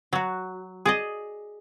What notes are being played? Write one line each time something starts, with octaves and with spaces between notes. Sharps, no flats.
F#3 F#4
G#4 D5 D#5